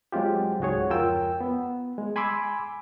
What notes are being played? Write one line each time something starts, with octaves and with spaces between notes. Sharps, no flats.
F#3 G#3 C4 F4 G4
C#2 G#2 F#4 G#4 C#5
F2 F4 A#4 G5 E6
B3
G#3
G#5 B5 C6 D6 E6